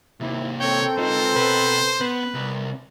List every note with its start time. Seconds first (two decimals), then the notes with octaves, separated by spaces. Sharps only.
0.20 D#2 C3 A#3 C4 E4
0.60 C4 A4 A#4 C#5 G5
0.99 D#4 F4 B4 C5
1.36 B2 B4
2.01 B3 B4
2.34 C2